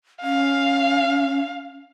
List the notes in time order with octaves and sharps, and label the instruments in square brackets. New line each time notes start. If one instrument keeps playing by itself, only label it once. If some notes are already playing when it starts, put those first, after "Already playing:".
[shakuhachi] C#4 [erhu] F5